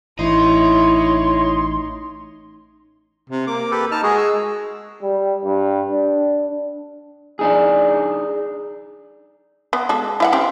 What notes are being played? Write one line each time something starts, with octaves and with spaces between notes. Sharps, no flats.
A1 D#4 E4 C#5 C6
C3
A#3 D6
G4 A4 B4
D#4 A5 F6
G#3 F#4 G#4
E6
G3
G2
D4
D4 D#4 G#4
B3
G#3 F#4 A4
E4 E5 F#5
C4 C#4 G4